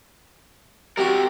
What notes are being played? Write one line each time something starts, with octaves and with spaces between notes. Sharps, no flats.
C3 G3 F#4 A#4